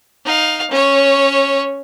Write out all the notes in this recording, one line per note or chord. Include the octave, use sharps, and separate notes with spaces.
D#4 F5
C#4 C#5